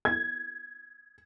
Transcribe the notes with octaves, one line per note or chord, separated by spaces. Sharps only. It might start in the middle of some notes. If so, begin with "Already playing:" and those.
G#6